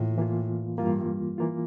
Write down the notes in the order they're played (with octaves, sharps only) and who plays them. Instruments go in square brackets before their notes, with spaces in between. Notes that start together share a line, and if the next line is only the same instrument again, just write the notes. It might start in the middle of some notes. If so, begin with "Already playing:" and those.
Already playing: [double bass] A2 [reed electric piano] E3 A#3 F4
[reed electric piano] E3 A#3 F4
[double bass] G2 [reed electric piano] E3 A#3 F4
[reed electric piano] E3 A#3 F4